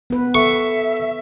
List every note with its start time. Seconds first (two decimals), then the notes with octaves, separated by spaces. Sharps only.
0.10 B3 B4
0.34 A4 E5 C#6